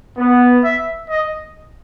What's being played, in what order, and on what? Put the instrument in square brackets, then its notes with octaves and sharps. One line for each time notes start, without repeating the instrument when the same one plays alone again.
[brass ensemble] B3
[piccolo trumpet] E5
D#5